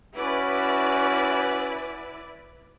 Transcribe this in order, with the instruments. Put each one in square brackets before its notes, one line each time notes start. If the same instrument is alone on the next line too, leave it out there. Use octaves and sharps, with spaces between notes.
[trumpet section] C#4 F#4 [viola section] E4 B4 D5